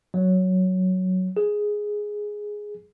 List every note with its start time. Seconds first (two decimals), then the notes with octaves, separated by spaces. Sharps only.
0.14 F#3
1.37 G#4